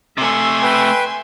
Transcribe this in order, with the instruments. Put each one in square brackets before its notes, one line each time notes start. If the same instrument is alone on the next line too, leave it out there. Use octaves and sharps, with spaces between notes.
[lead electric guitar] C3 A3 [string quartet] E5 G#5 C6
[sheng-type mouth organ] B4 G5